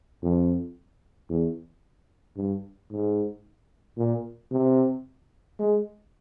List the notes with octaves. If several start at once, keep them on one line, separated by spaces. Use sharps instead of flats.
F2
E2
G2
G#2
A#2
C3
G#3